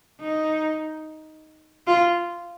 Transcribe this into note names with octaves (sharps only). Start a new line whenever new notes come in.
D#4
F4